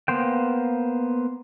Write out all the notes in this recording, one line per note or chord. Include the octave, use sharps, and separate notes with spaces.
A#3 B3 C5 G5